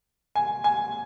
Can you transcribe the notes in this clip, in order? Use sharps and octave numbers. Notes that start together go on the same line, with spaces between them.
G#5
G#5